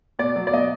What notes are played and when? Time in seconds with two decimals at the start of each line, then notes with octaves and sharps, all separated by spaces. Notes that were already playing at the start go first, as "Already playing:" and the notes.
0.19 B2 D5
0.36 F#3
0.47 D5
0.53 B2 D#5